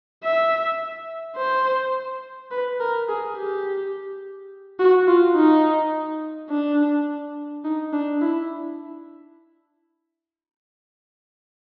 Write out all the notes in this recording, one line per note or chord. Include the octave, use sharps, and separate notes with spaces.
E5
C5
B4
A#4
G#4
G4
F#4
F4
D#4
D4
D#4
D4
E4